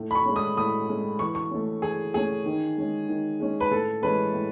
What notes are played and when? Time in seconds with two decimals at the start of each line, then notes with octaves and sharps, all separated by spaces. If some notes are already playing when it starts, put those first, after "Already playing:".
Already playing: A2
0.11 B5
0.15 C#6
0.26 G#3 C#4
0.36 D#6
0.57 A2 D#6
0.89 G#3 C#4
1.19 E3 C#6
1.35 C#6
1.51 A3 C#4
1.82 E3 G#4
2.14 A3 C#4 G#4
2.46 D#3
2.77 G#3 C#4
3.09 D#3
3.40 G#3 C#4
3.60 B4
3.71 A2 A4
4.02 E3 G#3 C#4 B4
4.34 A2